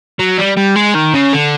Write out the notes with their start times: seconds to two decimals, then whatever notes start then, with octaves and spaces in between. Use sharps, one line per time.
0.19 F#3
0.38 G3
0.57 G3
0.76 G#3
0.95 D#3
1.14 C#3
1.33 D3